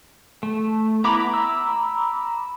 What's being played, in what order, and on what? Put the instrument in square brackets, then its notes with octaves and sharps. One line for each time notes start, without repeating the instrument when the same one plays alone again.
[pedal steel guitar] A3
[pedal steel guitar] B3 E4 [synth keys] A#5 B5 D6
[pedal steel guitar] E6